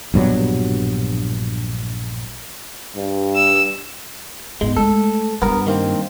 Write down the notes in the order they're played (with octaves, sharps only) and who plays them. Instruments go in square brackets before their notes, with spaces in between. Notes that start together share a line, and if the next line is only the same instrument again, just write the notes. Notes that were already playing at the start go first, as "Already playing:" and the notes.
[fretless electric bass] A#1 G2 B2 F#3
[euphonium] G2
[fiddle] E6
[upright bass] G#2 B3 [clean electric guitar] G#3
[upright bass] G#3 A3 [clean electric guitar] A4
[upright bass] G2 G3 [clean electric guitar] B3 A#4
[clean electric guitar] D#3 A#3 C4